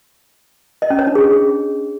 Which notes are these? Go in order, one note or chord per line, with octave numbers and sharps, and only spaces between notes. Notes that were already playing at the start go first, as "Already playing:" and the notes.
D#5
C#4
C#5
D4
G#4